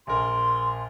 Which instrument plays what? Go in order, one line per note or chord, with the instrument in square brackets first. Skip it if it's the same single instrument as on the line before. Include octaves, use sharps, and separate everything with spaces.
[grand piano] A#1 A#4 [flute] C6